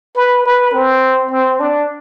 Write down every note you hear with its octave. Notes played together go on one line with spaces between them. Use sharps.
B4
B4
C4
C4
D4